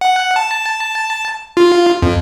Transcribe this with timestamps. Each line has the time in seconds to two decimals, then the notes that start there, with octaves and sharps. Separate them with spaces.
0.01 F#5
0.36 A5
1.57 F4
2.02 F2